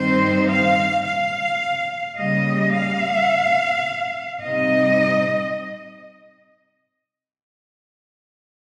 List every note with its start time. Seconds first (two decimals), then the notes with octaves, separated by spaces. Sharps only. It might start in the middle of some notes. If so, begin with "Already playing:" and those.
Already playing: G2 D#3 G3 C4 D#4 C5
0.47 F5
1.03 F5
2.17 C#3 G3 A#3 D#5
2.74 F5
4.44 C3 G3 C4 D#4 D#5